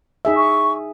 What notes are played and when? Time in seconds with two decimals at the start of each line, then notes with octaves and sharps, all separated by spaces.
0.25 D#4 G#4 E5
0.36 C#6